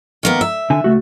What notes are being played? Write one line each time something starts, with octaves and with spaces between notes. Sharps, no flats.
D#3 A#3 B3
E5
D3 G#5
C#2 A3 F#4